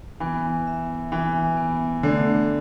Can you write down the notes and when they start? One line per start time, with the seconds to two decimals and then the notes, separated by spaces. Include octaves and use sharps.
0.20 E3 B3
0.67 E5
1.12 E3 E5
1.57 B3
2.03 D3 A3